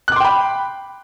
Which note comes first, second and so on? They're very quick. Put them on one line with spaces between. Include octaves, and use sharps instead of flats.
F#6 D6 C6 G5 B5